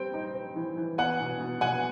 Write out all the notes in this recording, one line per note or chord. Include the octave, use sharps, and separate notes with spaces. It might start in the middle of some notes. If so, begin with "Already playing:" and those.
Already playing: G3 C4 G5
D#4
C4
E3
E3
B3 F#5 G#5
B2
B2
B2 F#5 G#5